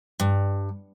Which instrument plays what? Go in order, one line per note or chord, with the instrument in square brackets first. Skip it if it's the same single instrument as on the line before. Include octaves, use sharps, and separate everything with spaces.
[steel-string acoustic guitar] G2